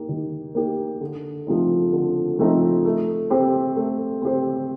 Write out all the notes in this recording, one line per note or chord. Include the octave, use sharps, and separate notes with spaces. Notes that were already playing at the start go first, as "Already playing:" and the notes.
Already playing: A#3 D#4 G4
D#3
A#3 D#4 G4
D3
F3 A3 C4 D#4
D3
F3 A3 C4 D#4
A3
C4 G4 C5
A3
C4 G4 C5